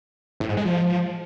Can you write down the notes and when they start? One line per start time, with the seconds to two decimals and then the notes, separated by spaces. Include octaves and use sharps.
0.40 A2
0.49 G#2
0.57 G#3
0.65 F3